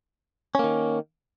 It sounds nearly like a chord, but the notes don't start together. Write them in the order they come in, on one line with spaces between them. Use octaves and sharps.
C#4 A#3 D#3